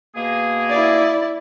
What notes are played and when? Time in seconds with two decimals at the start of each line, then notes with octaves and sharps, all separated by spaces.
0.16 B2 A#3 G#4
0.70 E4 D5